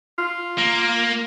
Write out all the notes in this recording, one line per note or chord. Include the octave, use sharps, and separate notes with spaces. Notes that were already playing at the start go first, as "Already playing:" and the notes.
F4
A#3